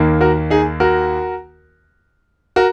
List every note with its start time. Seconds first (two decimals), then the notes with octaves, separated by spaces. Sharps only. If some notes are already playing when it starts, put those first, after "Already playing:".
Already playing: D#2 D#3 A#3
0.21 F#4 A#4
0.50 D#4 G#4
0.80 F#4 A#4
2.56 F#4 A#4